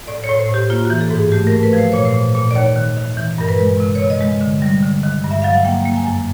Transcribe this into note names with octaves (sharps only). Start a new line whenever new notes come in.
A2 D5
C#5
A2
C5
A2 G4
A#3 F4
F#4
E3
A4
G#2
G#4
A3 G4
A#4
A3
B4
F3 C5
A#2 C#5
C5
A#2
A#2
D5
D#2 C#5
D#3
D#3
E3
G2 A#4
B4
G#3
C3
C3 C#5
D#5
G#3
D3
G3
D3
D#3
G2
E5
F#3 F5
F#5
A#3 G5
A#3
G#5
F#2